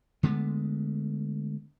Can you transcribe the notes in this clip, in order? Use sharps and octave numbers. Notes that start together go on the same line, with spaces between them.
D3 G#3 A3 B3